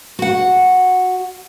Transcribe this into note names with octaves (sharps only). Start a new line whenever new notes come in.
F#4 F#5